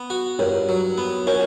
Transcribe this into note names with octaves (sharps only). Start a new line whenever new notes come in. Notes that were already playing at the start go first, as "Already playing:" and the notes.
Already playing: B3
F#4
G2 A#4 C#5
F#3
B3
C#4 A#4 C#5